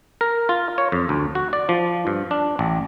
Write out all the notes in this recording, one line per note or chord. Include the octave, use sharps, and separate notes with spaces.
A#4
F4
C#5
F2
D2
F#4
D5
F3
G2
D4
A1